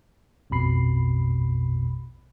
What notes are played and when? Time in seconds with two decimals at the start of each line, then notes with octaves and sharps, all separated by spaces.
0.50 A#1 F2 B2 B5 C7